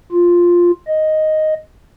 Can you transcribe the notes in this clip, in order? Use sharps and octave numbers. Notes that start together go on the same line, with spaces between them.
F4
D#5